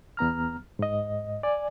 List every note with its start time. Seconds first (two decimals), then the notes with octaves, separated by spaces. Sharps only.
0.17 E2 B3 A#5 F6
0.79 G#2 D#5
1.43 D5 G#5